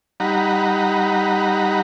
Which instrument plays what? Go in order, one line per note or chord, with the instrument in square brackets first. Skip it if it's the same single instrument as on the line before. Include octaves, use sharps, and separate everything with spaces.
[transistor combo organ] G3 D#4 F#5 A#5 B5